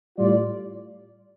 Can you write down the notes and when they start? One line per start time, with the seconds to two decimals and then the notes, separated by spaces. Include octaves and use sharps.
0.18 A2 G3 F4 D5